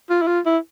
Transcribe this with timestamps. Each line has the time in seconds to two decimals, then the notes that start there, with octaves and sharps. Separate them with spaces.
0.10 F4
0.22 E4
0.27 F4
0.46 E4